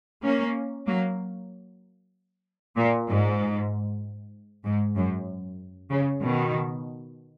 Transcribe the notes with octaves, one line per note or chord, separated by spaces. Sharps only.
A#3 C#4
F#3 A#3
A#2
G#2
G#2
F#2
C#3
B2 D#3